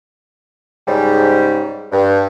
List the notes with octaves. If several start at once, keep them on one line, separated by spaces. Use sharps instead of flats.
G#2 C#3 G3
G2